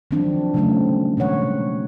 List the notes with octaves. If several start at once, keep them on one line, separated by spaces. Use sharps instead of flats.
D#3 F3 F#3 C4 D4
C#3 F#3 G3 A3 C4 C#4
B2 D#3 G#3 C#5 F#5